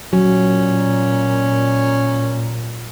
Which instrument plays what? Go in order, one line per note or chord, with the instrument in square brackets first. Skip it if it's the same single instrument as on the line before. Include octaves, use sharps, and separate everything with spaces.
[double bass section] A#2 [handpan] F#3 [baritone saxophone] C#4